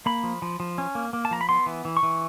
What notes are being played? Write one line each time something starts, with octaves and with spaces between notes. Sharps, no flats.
A#3 B5
F3
F3
F3
C#4
A#3
A#3
A5
F3 A#5
B5
B3 C6
E3
E3
C#6
E3